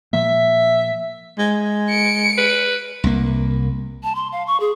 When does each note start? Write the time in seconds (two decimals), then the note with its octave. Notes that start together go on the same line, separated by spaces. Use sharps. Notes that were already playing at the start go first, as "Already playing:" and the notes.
0.13 A#2 F3 A#3 E5
1.38 G#3
1.89 C#7 D7
2.38 B4
3.04 C2 A#3
4.03 A5
4.15 C6
4.32 F5
4.47 C#6
4.60 G#4